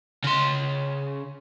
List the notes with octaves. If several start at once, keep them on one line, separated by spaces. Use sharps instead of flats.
C#3 C6